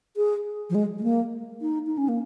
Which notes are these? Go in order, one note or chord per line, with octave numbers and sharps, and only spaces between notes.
G#4
F3
G#3
G#3
A#3
D#4
D#4
C#4
A#3